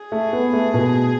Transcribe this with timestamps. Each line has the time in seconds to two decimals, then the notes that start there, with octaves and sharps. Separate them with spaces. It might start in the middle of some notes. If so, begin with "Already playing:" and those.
Already playing: G#4
0.12 A3
0.33 B3
0.53 A3
0.74 B2